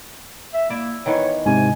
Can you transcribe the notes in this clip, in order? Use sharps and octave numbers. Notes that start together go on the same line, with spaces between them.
E5
A#3 E4 D5 E5
D#3 E3 B3 C#5
G#2 C3 G#5